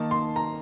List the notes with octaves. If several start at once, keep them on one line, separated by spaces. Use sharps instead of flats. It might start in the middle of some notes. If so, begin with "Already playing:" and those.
Already playing: D#3 A#3 D#4 A5
C6
A#5